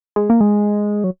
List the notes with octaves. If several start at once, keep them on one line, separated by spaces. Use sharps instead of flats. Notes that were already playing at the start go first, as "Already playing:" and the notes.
G#3
A#3
G#3
F#3